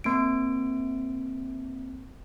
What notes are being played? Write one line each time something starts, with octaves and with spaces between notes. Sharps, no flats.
A#3 C4 D7